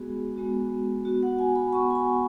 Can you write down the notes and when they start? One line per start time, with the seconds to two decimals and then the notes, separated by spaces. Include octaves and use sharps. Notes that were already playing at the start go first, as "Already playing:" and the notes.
Already playing: G#3 B3 F#4 G#4
0.36 G#3 B3 F#4
1.05 B3 F#4
1.23 F#5
1.39 G#5
1.56 B5
1.73 B3 F#4 C#6
1.91 G#5
1.95 B5